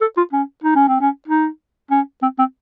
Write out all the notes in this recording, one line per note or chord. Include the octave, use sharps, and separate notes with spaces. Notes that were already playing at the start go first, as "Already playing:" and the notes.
A4
F4
C#4
D#4
C#4
C4
C#4
D#4
C#4
C4
C4